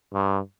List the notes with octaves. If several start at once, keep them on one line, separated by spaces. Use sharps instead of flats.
G2